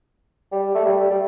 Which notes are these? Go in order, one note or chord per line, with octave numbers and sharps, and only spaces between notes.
G3
A3
G3
G3